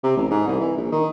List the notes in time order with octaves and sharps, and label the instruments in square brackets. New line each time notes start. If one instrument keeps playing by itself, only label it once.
[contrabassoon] C3
A1
G#2
C2
E3
A#1
D#3